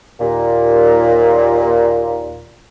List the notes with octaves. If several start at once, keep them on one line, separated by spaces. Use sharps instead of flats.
D#2 A#2